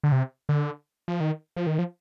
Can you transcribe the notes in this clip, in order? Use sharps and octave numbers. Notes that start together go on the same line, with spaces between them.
D3
C3
D3
F3
D#3
F3
D#3
F3